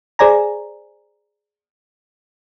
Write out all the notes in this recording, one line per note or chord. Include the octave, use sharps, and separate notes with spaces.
G#4 C5 D5 G#5 A#5